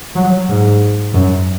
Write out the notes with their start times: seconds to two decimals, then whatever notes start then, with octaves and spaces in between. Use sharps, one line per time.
0.15 F#3
0.48 G#2
1.14 F#2